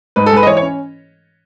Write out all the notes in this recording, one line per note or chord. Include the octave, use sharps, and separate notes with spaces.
G#2 B4
A4
G#3 B4
D#5
E3 C#5
C#5
C#4